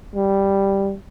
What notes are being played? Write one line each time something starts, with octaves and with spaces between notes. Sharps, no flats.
G3